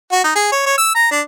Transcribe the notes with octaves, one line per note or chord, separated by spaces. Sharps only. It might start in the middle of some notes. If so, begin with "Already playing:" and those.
F#4
D#4
G#4
C#5
C#5
E6
A#5
D4